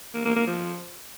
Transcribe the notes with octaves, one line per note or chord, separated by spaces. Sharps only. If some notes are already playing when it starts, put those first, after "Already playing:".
A#3
A#3
A#3
F3